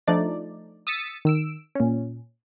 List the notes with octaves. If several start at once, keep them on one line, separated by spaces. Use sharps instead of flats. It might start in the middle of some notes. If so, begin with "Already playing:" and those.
F3 A3 D4 D#4 D5
D#6 E6 A6 B6 C#7 D#7
D#3 E6 D7
A#2 C#4